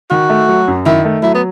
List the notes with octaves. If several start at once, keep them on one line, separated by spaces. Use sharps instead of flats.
D#3 F#4
A3
F#3
F#2
D#3 E4
A3
F#3 E4
B3